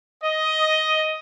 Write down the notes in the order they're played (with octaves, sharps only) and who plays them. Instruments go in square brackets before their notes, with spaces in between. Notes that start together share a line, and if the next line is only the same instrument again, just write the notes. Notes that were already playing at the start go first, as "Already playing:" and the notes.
[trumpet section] D#5